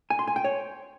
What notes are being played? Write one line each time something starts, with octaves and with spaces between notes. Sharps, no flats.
G#5
C6
G#5
G5
C#5